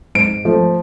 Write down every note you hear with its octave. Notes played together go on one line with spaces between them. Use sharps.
G#2 D7
F3 A3